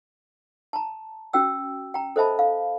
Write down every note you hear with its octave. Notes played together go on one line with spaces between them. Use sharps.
A5 A#5
C#4 F#4 G5 E6
G5 A#5
A4 C5 D#5 E5 A5 B5
F5